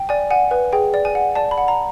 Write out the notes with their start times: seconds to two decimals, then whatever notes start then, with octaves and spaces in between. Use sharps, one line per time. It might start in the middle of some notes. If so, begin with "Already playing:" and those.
Already playing: G5
0.09 D5 G#5
0.30 F#5 G#5
0.51 B4 G#5
0.73 G#4 G5
0.94 D5
1.05 G#5
1.15 F#5
1.35 D5 A5
1.51 B5
1.58 F#5
1.68 A#5